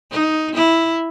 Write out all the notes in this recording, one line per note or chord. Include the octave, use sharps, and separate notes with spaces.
D#4
E4